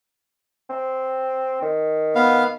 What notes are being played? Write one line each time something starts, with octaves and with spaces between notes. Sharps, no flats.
C4
D#3
B3 F5